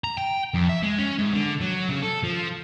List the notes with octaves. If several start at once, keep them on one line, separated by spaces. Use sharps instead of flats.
A#5
G5
F2
E5
G#3
C#4
G#2
D3
F#3
C#3
A4
F3